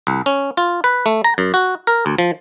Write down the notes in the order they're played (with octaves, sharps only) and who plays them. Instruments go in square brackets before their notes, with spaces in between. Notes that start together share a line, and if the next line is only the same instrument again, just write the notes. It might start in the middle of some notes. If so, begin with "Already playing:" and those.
[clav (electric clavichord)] C2
C#4
F4
B4
A3
A#5
F#2
F#4
A#4
D2
F3